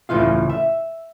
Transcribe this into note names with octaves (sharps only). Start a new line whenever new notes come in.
C#2 A2 C#3 E3 F4 F5
E5